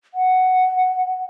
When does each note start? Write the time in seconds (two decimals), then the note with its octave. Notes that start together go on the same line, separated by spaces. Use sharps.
0.14 F#5